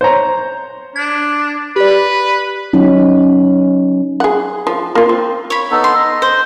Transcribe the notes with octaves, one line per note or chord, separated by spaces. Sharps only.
C5 C#5 A#5
D4 G#6
G4 B4 D5
F#3 C#4 D#4
G#4 F#5
F3
A#3 F4
C4
C#5 B5
B3 D#4 A4
C6
D#5
C5